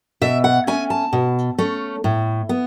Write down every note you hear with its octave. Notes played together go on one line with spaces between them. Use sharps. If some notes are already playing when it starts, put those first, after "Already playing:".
B2 E5
F#5
A3 C#4 G#5
A5
B2
A3 C#4
A2
B3